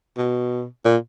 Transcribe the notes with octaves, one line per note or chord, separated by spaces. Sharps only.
B2
A#2